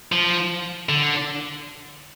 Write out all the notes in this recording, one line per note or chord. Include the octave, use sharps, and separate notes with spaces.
F3
D3